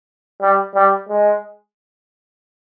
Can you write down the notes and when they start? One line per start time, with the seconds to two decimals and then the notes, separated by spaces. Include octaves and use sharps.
0.41 G3
0.75 G3
1.09 G#3